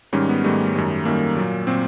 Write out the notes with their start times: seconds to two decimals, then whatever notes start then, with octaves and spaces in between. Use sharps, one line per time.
0.13 G#2 D#3 G3 C#4
0.29 B3
0.44 G#2 D#3 G3 A3
0.75 F#2 D#3 G3
1.05 F#2 D#3 G3 A#3
1.37 A#2 F#3
1.67 A#2 F#3 C4